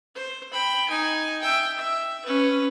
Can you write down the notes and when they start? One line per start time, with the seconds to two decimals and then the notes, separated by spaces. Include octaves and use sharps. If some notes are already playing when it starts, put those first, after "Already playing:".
0.15 C5
0.52 G5 B5
0.88 D#4 G#5
1.41 E5 G5
1.76 E5
2.25 C#4 B4